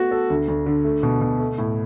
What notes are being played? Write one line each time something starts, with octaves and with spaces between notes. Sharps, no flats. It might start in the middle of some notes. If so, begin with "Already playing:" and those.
Already playing: A3 B3 F#4
A4
D2
D2
D3
A3
B2
B2
A3
A2